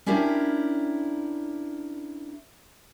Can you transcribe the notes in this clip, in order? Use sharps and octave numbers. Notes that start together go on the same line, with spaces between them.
C#4 D4 E4 G4 A#4